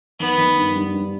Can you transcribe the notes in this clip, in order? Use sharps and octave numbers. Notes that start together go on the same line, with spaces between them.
D#3 B3
D#3
G2
G2
G2